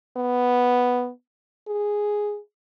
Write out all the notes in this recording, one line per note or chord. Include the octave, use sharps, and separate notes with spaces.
B3
G#4